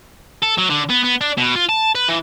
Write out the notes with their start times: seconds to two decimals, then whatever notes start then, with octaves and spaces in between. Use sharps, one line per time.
0.42 A4
0.58 F#3
0.70 D3
0.89 B3
1.04 B3
1.21 D4
1.38 B2
1.56 F4
1.69 A5
1.95 B4
2.08 E3